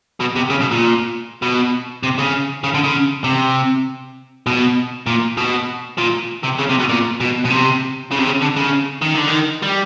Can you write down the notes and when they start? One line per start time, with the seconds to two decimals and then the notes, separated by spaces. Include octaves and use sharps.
0.20 B2
0.36 C3
0.50 C#3
0.61 B2
0.71 A#2
1.42 B2
2.03 C3
2.18 C#3
2.64 C#3
2.74 D3
2.84 C#3
3.24 C3
4.46 B2
5.06 A#2
5.38 B2
5.98 A#2
6.44 C3
6.59 C#3
6.70 C3
6.80 B2
6.89 A#2
7.20 B2
7.45 B2
7.50 C3
8.11 C#3
8.18 C3
8.25 C#3
8.41 D3
8.56 C#3
9.02 D#3
9.15 D3
9.28 D#3
9.63 G3